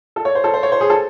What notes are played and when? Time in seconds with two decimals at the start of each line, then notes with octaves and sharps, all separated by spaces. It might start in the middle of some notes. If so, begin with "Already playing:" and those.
0.16 A4
0.25 C#5
0.35 C5
0.44 A4
0.54 C5
0.63 C#5
0.72 C5
0.81 G#4
0.90 A4